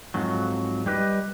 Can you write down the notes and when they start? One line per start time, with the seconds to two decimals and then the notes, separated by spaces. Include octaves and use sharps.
0.14 F2 G#2 F#3
0.86 G3 G4 B4 D#5